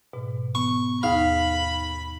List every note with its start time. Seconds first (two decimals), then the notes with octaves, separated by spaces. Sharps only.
0.13 G#2 B2
0.55 B3 C#6
1.03 D#2 D#4 G#4 F5 B5